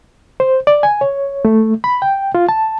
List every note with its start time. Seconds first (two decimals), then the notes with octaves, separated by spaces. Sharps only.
0.40 C5
0.67 D5
0.83 G#5
1.01 C#5
1.45 A3
1.84 B5
2.02 G5
2.35 F4
2.49 A5